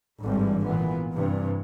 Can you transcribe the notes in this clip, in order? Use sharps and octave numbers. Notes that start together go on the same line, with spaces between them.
G#1 G2 D3 E3 G3
A#2 E3 B3
G2 C3 E3